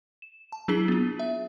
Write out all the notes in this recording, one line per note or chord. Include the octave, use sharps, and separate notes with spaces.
E7
A5
F#3 D4 E4 G#4 B6 G7
B3 F4
E5